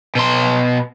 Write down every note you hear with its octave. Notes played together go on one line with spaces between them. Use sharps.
B2 C6